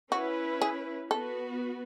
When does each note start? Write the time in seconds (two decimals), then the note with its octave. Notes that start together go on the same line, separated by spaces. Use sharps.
0.12 C#4 E4 F#4 B4
0.62 G#4
1.11 B3 F#4 A4 B4